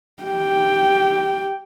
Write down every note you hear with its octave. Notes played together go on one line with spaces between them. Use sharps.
G4 G5